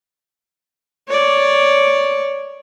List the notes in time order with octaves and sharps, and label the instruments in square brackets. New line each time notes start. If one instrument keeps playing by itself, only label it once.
[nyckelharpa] C#5 D5